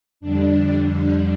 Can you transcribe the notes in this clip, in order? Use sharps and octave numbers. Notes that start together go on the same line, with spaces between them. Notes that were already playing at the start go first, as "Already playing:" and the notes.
F2 D3 G3 D4